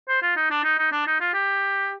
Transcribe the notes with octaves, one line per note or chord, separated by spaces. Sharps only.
C5
F4
D#4
D4
D#4
D#4
D4
D#4
F4
G4